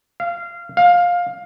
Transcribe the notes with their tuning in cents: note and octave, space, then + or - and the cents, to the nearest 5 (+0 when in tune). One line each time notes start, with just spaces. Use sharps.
F5 -20
F5 +15